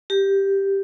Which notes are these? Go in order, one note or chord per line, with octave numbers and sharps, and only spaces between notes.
G4